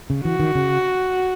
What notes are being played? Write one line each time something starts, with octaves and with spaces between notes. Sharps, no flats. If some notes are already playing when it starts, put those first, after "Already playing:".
C#3
E3 F#4
D#3
C#3